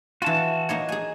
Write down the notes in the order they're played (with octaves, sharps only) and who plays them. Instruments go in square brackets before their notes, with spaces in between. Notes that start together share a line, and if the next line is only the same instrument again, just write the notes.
[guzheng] E3 F4 [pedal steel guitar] F#4 A5
[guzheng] A#3 D#4 C#5
G#4 G#5